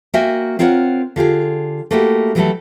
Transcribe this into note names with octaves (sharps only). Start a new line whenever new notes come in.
A#3 F#4 A#4 E5 G5 G#5
C4 F4 A#4 C#5 D#5 F#5
D3 F4 G4 G#4
A3 A#3 E4 F#4 G4
E3 F#3 G3 A3 E4 A4